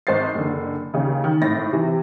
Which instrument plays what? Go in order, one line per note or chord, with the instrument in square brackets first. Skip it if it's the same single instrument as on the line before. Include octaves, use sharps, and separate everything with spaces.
[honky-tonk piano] G#1 C5 D#5 A6 C7
F#1 D3
D#2 C#3
D#3
G#1 A2 A6 A#6
C3 E3